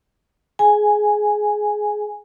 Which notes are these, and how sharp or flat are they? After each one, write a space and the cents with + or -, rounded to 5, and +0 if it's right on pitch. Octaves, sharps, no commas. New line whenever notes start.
G#4 +15 G#5 -5